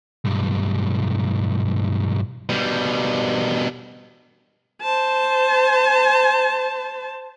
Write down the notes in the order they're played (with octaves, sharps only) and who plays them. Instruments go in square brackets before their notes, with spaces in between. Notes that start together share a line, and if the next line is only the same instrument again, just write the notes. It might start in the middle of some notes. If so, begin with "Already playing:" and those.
[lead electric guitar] B1 G2
B2 G3
[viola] C5 A5